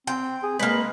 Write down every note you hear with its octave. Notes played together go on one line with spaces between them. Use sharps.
C4 G5
G#4
G#3 A#3 B4